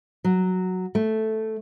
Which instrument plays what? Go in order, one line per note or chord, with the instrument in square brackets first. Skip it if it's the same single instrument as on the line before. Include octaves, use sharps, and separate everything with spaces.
[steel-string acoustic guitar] F#3
A3